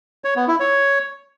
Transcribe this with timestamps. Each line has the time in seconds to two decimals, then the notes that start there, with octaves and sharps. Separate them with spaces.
0.24 C#5
0.36 B3
0.48 E4
0.60 C#5